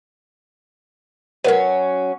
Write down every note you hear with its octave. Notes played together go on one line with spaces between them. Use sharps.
F#3 C#4 A#4 B4